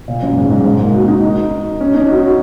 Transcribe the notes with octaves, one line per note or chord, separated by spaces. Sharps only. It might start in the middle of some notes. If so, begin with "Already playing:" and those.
A#2
F#2
G#2
G#2
G#2
A#3
F#4
D#4
C#4
D#4
F#4
F#4